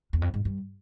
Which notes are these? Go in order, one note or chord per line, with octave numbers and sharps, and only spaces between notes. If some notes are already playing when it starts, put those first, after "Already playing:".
E2
F2
G#2
G2